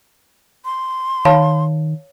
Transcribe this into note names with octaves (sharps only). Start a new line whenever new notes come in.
C6
D#3 C#5 F5 A5 B5